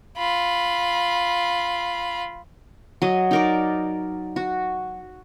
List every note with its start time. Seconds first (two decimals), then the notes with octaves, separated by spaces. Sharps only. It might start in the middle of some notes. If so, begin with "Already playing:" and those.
0.18 F4 B5
3.02 F#3 D#5
3.31 D#4 A#4 D5
4.36 F#4